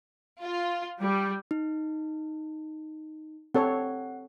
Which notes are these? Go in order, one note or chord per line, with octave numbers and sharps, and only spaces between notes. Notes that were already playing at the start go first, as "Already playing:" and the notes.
F4
G3
D#4
C4 A4 C#5 F#5